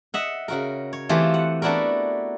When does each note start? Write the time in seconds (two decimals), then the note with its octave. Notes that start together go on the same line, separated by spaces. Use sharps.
0.14 D#5 E5 F#5
0.48 C#3 F#4 A#4
0.93 C#5
1.09 E3 A3 C4 F4 G4 C5
1.34 F#5
1.62 A3 B3 D4 E4 F#4 A#4